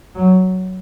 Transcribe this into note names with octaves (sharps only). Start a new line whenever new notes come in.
F#3